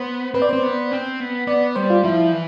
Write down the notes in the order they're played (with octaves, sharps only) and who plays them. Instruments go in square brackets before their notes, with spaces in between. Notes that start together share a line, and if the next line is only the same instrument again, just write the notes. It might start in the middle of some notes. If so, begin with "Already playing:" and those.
Already playing: [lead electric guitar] B3 [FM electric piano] C5
[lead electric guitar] C4 [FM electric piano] B4
[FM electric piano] D5
[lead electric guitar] C4 [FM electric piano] C5
[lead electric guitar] B3
C4
B3
[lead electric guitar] B3 [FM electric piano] D5
[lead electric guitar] G3 [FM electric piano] C5
[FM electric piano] F4
[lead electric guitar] F3 [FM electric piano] E4
[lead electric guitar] E3